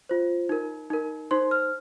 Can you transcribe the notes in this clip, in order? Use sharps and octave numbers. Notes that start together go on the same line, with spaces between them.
F4 C5
D#4 A#4
D#4 A#4
D#4 C5 C6
F6